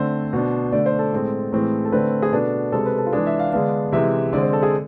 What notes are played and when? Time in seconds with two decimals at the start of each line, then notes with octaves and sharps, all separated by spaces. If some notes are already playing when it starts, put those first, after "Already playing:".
Already playing: D3 A3 C4 C5
0.33 B2 B3 D4
0.72 D3 A3 D4 D5
0.86 C5
0.99 A4
1.13 A2 G#3 C4
1.52 A2 E3 G#3 C4
1.85 A4
1.92 D3 A3 C4 B4
2.22 G#4
2.32 B2 B3 D4 A4
2.72 C3 G#3 C4 A4
2.86 B4
2.98 A4
3.06 F4
3.13 E3 G#3 D4 G#4
3.27 E5
3.39 F5
3.52 D3 G#3 B3 D4 F5
3.93 C3 E3 G#3 E5
4.33 D3 G#3 C4 D5
4.43 C5
4.53 A4
4.63 G#4